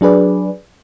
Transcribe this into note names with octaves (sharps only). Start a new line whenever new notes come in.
F#3 D4 G#4 B4 D5